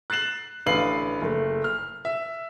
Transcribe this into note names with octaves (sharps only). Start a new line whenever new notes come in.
F#6 A6 C7 E7 F#7
A1 D3 B4 F5 C7 F#7
F#1 A3
F6
E5